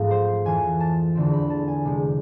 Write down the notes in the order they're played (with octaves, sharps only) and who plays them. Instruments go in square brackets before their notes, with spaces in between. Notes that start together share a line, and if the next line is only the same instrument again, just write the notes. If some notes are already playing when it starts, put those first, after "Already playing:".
Already playing: [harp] G#2 F3 A3 C4
C5
F2 E3 A3 G#5
A5
E2 D3 A3 C4
B5
A5
G#5
C3 G#3 C4